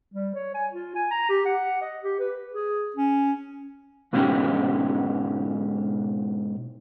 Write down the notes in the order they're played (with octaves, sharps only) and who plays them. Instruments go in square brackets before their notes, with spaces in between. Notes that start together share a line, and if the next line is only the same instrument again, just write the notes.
[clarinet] G3
C#5
G#5
F4
G#5
A#5
G4
F#5
D#5
G4
B4
G#4
C#4
[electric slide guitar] G#2 B2 G#3 C#4 D#4 G4